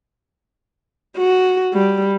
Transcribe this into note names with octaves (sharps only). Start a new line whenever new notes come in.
F#4
G3